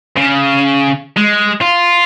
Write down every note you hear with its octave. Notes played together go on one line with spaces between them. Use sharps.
C#3
G#3
F4